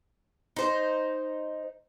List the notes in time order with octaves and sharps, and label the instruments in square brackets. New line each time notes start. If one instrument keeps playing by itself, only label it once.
[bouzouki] D#4 C5